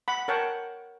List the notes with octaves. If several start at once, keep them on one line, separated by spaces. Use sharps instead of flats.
F#5 B5
A#4 C#5 F#5 G5 A5